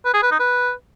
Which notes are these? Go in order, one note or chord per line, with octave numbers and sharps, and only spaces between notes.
B4
G#4
B4
D#4
B4